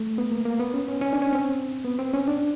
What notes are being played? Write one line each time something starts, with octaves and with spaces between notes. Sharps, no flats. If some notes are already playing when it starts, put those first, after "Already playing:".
Already playing: A3
B3
A#3
A#3
B3
C#4
C#4
C#4
D4
C#4
C4
B3
C4
C#4
D4